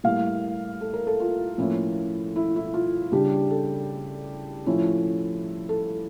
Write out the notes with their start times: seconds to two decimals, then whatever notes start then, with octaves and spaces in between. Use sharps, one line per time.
0.04 A2 G3 A#3 F5
0.81 A4
0.94 A#4
1.07 A4
1.20 F4
1.58 A2 F3 A#3 C#4 E4
2.36 E4
2.56 E4
2.74 F4
3.12 C#3 G3 D4 G4
3.51 A4
4.66 A2 F3 C#4 E4
5.69 A4